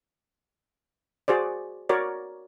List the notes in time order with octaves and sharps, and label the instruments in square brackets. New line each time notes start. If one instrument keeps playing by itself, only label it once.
[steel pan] F#4 G#4 C5 D5
F#4 A#4 C#5 D5